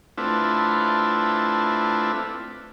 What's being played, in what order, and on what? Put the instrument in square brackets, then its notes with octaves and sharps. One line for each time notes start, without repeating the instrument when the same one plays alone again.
[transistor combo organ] A3 C4 D4 E4 F4 B4